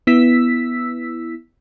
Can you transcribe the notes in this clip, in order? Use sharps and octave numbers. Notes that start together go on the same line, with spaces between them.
B3 E4 E6 B6